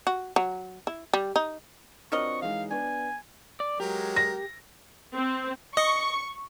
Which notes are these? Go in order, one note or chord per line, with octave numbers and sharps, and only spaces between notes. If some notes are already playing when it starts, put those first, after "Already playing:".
F#4
F#3
E4
G3
D#4
F#3 C4 D4 F4 A#4 D#5 C#6
E3 G#3 D#4 F5
B3 D4 G#5
D5
F#3 G#3 G4 A#4
A#6
C4
D#5 C#6